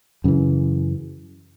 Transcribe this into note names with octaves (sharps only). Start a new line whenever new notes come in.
F#2 C#3 E3